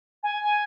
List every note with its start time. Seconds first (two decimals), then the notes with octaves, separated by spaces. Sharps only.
0.23 G#5